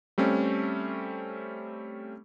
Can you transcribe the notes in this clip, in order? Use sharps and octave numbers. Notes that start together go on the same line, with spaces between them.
G3 A3 C4 C#4